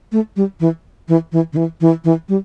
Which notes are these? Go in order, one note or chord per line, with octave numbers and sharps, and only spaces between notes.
A3
G3
E3
E3
E3
D3
E3
E3
E3
G3